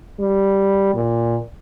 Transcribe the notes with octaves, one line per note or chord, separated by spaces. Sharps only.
G3
A#2